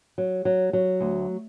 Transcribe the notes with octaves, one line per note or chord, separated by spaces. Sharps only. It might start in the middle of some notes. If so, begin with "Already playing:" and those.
F#3
F#3
F#3
D2